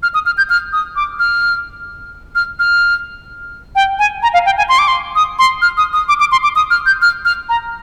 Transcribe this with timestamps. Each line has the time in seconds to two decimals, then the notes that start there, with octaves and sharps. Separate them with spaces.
0.03 F6
0.14 D#6
0.26 F6
0.38 G6
0.50 F6
0.73 D#6
0.96 D6
1.19 F6
2.35 F6
2.59 F6
3.75 G5
3.99 G#5
4.23 A#5
4.34 F5
4.46 G5
4.58 G#5
4.69 C6
4.79 D6
4.88 C6
5.16 D#6
5.39 C6
5.62 F6
5.77 D#6
5.93 D#6
6.09 D6
6.20 D6
6.32 C6
6.43 D6
6.55 D#6
6.71 F6
6.86 G6
7.02 F6
7.25 F6
7.49 A#5